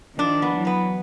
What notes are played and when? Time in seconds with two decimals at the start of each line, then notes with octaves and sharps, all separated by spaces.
0.18 D#3 F3 D4
0.42 B3
0.54 E3 F#3
0.67 B3